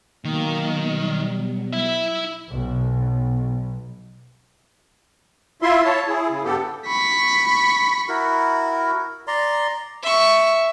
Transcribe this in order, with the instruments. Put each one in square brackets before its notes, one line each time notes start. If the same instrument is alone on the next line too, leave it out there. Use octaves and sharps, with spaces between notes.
[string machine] B2 F#3 [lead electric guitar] D#3 [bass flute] A#3
[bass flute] G3
[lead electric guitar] E4 E5
[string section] B1
[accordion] E4 F4 E5 C6
C#5 A5
E4 G#4
C#3
G2 B3 G4 A4
[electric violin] B5 C#6
[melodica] E4 F#4 A#4
D5 A#5 C6
[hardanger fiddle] E5 C#6